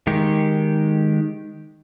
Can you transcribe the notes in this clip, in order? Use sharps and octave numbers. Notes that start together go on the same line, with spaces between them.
D#3 G#3 G4